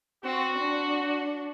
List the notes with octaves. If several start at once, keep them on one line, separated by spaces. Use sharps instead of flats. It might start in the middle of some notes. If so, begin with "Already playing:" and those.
C4 F#4
D4